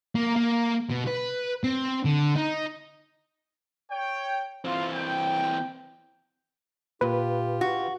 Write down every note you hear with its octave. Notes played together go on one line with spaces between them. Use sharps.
A#3
A#3
B2
B4
C4
D3
D#4
C#5 G5
E3 C4 F4
G5
A#2 F4 G4 B4
F#4